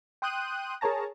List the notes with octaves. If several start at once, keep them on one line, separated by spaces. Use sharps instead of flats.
G5 C6 D#6 F#6 G6 D#7
G#4 A#4 C#5 A5 A#5